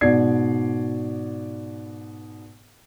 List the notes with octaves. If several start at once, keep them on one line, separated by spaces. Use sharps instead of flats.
G#2 B2 D5 G#6 C7